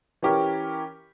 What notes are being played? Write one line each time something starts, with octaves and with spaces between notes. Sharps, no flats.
E3 C#4 G4 A#4